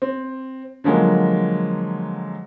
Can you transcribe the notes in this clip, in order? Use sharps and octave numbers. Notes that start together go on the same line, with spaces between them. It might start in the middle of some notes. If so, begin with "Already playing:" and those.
C4
D3 F3 F#3 G#3 A#3